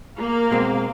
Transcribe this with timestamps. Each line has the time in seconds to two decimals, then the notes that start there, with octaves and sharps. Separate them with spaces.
0.16 A#3 F5
0.51 B2 G#3 C4